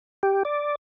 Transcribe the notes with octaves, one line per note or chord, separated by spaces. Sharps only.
G4
D5